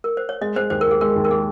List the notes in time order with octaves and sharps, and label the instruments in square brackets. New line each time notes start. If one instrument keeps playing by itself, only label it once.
[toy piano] A#4
C5
C#5
[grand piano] G#3 [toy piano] D#5
[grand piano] G#3 [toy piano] C5
[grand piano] D#2 [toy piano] C5
[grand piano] D#2 [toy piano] A#4
[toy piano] G#4
[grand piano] G#3 [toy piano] A#4
[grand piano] D#2
[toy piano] A#4
[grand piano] G#3 [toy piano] G#4